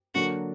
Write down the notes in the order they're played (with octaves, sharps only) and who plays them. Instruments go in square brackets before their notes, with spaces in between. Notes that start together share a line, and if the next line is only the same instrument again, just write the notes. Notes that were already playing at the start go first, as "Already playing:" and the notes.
[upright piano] D3 F#3 A#3 D4 [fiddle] F#4